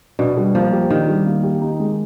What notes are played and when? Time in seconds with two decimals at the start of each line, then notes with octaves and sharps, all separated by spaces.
0.19 B2 D4
0.37 G3
0.55 F3 A#3
0.72 G4
0.90 D#3 D4
1.08 G3
1.26 A#3
1.43 G4
1.61 D#4
1.80 G#3